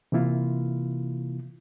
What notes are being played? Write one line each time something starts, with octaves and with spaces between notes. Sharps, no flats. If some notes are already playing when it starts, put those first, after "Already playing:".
C3 E3 A#3 E4 F4